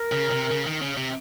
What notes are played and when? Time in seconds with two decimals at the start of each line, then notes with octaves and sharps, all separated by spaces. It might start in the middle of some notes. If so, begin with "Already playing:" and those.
Already playing: A#4
0.12 C#3
0.32 C3
0.51 C#3
0.67 D#3
0.82 C#3
0.97 C3